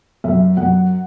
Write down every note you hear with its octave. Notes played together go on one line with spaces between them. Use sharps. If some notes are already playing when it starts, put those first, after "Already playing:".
F#2 E5
F#2 F#5